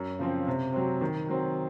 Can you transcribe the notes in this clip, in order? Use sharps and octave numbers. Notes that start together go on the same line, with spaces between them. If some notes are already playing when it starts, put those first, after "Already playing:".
Already playing: F#2
C#3 F3 C4
C3
F#3 C4
D#3
F#3 C4